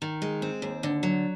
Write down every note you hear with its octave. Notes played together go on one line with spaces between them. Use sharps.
D#3
G#3
C4
D#2
D3
F#3